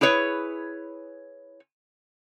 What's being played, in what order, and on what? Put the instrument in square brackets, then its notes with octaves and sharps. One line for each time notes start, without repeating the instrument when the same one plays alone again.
[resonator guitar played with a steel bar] E4 G#4 B4 C#5